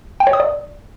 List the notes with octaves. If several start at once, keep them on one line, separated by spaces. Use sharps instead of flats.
G5
C#5
D#6
D5